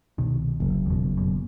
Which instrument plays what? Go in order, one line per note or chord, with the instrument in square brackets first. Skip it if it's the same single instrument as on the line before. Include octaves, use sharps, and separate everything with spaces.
[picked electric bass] C2 B2 D#3
[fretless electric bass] F#1
[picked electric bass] E2 B2
F#2 B2